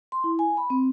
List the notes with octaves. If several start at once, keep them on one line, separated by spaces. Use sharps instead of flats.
C6
E4
G#5
B5
C4